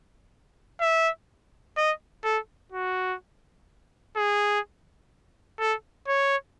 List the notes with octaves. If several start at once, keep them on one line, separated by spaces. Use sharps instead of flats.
E5
D#5
A4
F#4
G#4
A4
C#5